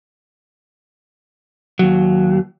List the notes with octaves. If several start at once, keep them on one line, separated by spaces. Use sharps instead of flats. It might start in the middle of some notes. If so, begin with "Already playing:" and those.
D#2 F#3